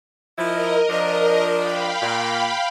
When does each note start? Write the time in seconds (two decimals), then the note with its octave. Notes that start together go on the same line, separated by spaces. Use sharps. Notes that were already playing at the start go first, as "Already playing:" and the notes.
0.38 F3 E4 A#4 D#5
0.90 F3 D4
1.54 F5 G5 B5
2.02 A#2